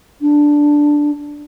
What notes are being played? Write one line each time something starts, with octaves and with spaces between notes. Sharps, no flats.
D4